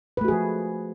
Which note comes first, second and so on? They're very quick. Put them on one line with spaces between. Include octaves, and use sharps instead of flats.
B4 A3 F#4 G#4 F3